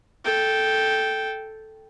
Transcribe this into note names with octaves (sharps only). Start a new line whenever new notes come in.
A4 G5